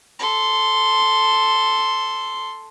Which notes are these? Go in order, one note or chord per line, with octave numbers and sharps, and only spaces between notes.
A4 C6